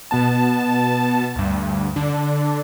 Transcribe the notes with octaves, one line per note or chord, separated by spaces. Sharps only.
B2 B3 A5
D2 G2
D3 D4